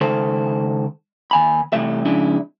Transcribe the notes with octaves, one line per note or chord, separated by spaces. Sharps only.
C#2 D#3 A4 C5
D#2 G#5 B5
C3 E3 G3 A3 E5
F2 C#3 G#3 D4 E4